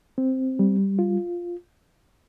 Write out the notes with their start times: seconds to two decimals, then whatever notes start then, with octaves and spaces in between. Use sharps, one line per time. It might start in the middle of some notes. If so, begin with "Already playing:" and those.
0.18 C4
0.59 G3
0.99 F4